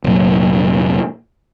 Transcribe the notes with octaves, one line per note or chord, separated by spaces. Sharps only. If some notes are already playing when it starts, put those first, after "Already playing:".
F1 A#2 F#3